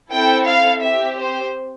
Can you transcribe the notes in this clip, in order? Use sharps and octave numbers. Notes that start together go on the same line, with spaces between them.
C4 E4 A4 G5
F5
C4 G4 E5
C5